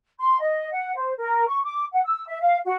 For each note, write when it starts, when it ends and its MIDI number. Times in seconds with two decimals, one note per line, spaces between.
0.20 0.39 84
0.40 0.71 75
0.72 0.94 78
0.95 1.13 72
1.17 1.45 70
1.47 1.60 85
1.63 1.84 86
1.93 2.00 78
2.05 2.23 88
2.27 2.41 76
2.41 2.57 77
2.65 2.75 66